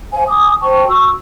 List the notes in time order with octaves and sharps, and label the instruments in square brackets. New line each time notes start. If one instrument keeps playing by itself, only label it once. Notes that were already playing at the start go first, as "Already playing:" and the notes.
[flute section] C5 F5 G#5
G#5 D6 D#6
C5 G5 A5 C#6
F#4 C#6 E6